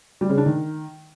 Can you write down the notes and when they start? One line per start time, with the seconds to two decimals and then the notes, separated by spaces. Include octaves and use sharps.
0.21 G3
0.29 C#3
0.38 D4
0.46 D#3